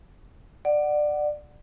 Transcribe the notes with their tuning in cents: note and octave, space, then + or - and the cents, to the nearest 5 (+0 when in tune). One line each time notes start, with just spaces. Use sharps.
D5 +20 F#5 +5